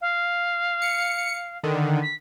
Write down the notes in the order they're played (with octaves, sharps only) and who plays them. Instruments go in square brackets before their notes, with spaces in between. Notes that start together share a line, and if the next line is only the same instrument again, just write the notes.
[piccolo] F5
[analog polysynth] C#7
D3 D#3
[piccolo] B6